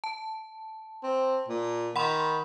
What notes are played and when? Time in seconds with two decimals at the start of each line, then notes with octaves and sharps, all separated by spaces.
0.04 A5
1.03 C4
1.48 A#2
1.96 D#3 F#5 B5 C6